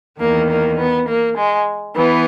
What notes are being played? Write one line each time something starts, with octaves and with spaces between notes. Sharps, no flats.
E2 D#3 A#3
A#3
B3
A#3
G#3
E3 B3